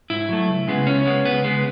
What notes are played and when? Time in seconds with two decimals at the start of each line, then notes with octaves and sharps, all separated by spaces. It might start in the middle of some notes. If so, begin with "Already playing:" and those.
0.10 G#2 E4
0.29 F#3 A3
0.48 C#2
0.67 C#3 G#3 B3
0.87 C#2 C#4
1.06 C#3 G#3 B3
1.25 C#2 B3
1.44 C#3 G#3 B3